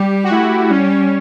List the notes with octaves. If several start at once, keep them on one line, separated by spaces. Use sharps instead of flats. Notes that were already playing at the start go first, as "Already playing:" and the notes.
Already playing: G3 G4
F#4
A3 E4
E4
G3 C#4